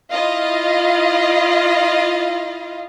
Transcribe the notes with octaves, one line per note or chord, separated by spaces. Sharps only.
E4 F4 D#5 F5